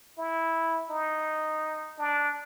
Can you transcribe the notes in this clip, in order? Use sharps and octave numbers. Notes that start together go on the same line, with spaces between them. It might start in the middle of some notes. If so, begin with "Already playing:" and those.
E4
D#4
D4